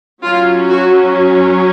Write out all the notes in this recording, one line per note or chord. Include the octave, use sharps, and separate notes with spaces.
F#3 C#4 F4
F#4